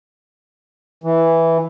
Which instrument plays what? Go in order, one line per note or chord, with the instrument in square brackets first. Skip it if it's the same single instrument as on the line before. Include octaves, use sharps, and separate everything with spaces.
[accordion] E3